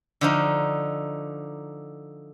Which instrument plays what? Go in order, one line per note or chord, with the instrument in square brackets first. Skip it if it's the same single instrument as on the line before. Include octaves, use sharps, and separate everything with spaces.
[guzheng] D3 F3 D#4